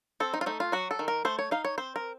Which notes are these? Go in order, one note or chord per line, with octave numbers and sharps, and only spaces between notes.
C4 A4
D#4
F4
A3 D#4
F4
F#3 F#4
A4
D#3
A#4
A3 C5
C#5
D#4 F5
C#5
C4 C5
A#4